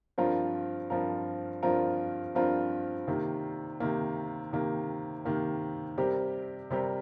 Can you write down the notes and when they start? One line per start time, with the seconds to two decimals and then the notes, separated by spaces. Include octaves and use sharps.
0.18 G2 F3 C4 F4 A#4
0.90 G2 F3 C4 F4 A#4
1.63 G2 F3 C4 F4 A#4
2.35 G2 F3 C4 F4 A#4
3.08 C3 D#3 A#3
3.80 C3 D#3 A#3
4.53 C3 D#3 A#3
5.25 C3 D#3 A#3
5.98 C3 G3 C4 G4 A#4
6.70 C3 G3 C4 G4 A#4